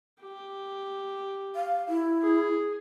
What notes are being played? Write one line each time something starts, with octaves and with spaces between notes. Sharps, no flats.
G4
F5
E4
G#4